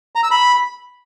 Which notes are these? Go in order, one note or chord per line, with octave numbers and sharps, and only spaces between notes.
A#5
E6
B5